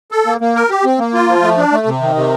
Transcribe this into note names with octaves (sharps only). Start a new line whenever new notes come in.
A4
A#3
A#3
A#4
G4
C4
A#3
F4
F3
A3
D4
A3
C3
D#3
C3